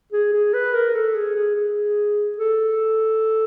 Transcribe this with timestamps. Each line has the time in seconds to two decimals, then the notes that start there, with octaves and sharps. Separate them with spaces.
0.12 G#4
0.33 G#4
0.54 B4
0.74 A#4
0.95 A4
1.15 G#4
1.36 G#4
1.56 G#4
2.38 A4